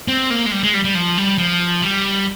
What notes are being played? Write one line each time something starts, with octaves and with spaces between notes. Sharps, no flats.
C4
A#3
G#3
G3
G#3
G3
G3
F3
G3
F3
G3